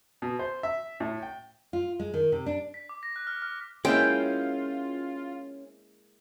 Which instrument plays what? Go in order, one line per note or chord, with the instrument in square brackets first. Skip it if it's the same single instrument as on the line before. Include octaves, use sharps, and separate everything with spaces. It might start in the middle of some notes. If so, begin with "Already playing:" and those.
[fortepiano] B2
C5
E5
A2
G5
[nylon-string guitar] F4
G#3
D#3
C3
D4
[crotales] B6
D6
A#6
F#6
F6
F6
[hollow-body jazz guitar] G#3 A#3 E4 [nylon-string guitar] C#4 D#5 [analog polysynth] F4 [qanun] G5